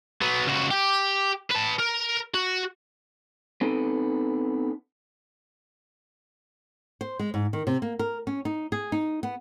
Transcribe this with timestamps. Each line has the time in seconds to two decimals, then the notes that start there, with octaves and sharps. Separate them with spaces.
0.22 F#3 B3
0.48 C#2 F#4
0.71 G4
1.50 B4 A5
1.79 A#4
2.34 F#4
3.61 B3 C4 D#4 A4
7.01 C5
7.19 G#3
7.34 G#2
7.53 D#3
7.67 C3
7.82 A#3
7.99 A#4
8.27 C#4
8.45 D#4
8.72 G#4
8.92 D#4
9.23 B3